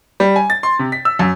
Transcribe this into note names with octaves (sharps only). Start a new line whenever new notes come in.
G3
G#5
A6
C6
C3
B6
E6
F#2